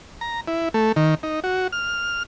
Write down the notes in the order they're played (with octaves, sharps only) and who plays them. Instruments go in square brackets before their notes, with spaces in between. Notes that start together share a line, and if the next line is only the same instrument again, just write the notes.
[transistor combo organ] A#5
E4
A3
D#3
D#4
F#4
F6